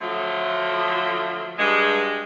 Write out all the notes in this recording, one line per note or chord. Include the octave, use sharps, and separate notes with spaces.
D3 F3 F#3 A3 F4
G2 G#3